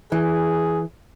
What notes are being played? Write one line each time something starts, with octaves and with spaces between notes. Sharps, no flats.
E3 G#4